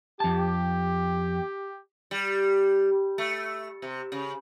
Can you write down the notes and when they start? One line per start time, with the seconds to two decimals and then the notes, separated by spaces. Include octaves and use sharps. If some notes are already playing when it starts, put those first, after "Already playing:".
0.20 F2 G4 A5
2.11 G3
3.18 A3
3.82 C3
4.12 C#3